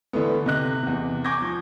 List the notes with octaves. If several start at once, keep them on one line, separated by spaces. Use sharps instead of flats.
D3 E3 A3 B3
C3 D#5 F#6
E2 C3
G#5 C#6 D6 G6 G#6 A#6
F3